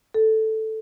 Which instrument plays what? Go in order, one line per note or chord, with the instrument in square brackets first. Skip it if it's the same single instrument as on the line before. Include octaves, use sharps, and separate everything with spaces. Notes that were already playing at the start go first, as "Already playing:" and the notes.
[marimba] A4